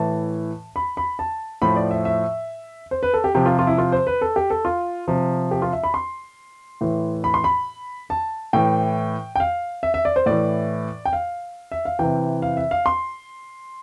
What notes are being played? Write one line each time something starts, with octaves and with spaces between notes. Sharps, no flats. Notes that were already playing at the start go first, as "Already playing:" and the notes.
Already playing: A2 E3 A5
B5
B5
A5
A2 F3 B5
D5
E5
E5
C5
B4
A4
G4
C3 F3 G4
F4
F4
E4
F4
C5
B4
A4
G4
A4
F4
C3 F3
G4
F4
E5
B5
C6
A2 E3
B5
C6
B5
A5
A2 E3 G5
G5
F5
E5
E5
D5
C5
A2 E3 D5
G5
F5
E5
F5
C3 E3 G5
F5
E5
F5
C6